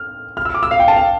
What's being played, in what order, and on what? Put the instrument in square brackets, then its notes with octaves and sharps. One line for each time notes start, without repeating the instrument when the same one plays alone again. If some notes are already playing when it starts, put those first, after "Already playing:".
Already playing: [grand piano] F6
F6
E6
D6
E6
F5
G5
A5
F5